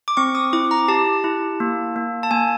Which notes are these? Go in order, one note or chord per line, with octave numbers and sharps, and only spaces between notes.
D6
C4 C#6
D#6
E4 D6
A#5
G4 A5
E4
A#3
A#3
A5
A#3 G#5